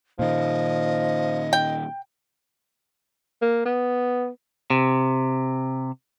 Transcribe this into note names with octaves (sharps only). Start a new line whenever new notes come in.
A#2 D#3 F3 D#5
G5
A#3
B3
C3